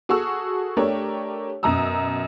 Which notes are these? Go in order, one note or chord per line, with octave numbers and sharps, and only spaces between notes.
F#4 G#4 A4 C#6 E6
A3 D4 G4 A#4 C#5
F#2 B2 A#5 D#6 E6